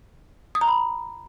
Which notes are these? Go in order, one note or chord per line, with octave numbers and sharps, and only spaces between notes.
D#6
A#5
B5